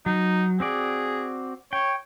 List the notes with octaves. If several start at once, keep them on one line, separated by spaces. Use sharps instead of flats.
F#3 D#4
C4 F#4 G#4 D5
C#5 G5